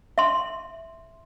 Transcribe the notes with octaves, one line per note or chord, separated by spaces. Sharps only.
E5 C6